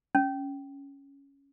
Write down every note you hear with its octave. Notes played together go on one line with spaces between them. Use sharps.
C#4